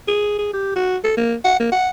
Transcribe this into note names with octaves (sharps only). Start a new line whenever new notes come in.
G#4
G#4
G4
F#4
A4
A#3
F#5
A#3
F#5